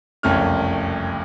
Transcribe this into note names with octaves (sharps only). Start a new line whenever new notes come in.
F#1 C2 F2 A3 C#4 F6